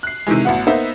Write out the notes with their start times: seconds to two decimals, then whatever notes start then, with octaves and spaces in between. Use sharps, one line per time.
0.03 F#6 C7
0.27 C3 D#3 E3 G#3
0.45 A1 B3 F#4
0.67 A#3 B3 D#4 C5 E5